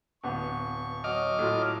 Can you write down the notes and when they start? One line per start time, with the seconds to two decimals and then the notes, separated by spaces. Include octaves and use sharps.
0.24 D1 B3 C#6
1.04 F#3 D#5 D6 F6
1.39 A2 F#3 F4 A4